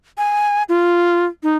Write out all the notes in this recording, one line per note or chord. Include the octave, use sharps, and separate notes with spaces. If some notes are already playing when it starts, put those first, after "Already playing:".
G#5
F4
D#4